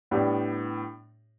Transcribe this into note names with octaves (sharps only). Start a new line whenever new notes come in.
A2 G3 B3 D4 G4